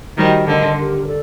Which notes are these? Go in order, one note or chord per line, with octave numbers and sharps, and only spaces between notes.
D#3 G3 F#4 C5 D#5 G5
D3 A#4 D#5 A5 C6
D4 G4 A#4
A4 D5